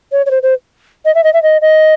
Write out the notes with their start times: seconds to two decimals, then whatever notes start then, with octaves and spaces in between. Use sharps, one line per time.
0.12 C#5
0.26 C#5
0.31 C5
0.43 C5
1.05 D#5
1.15 E5
1.24 D#5
1.33 E5
1.43 D#5
1.62 D#5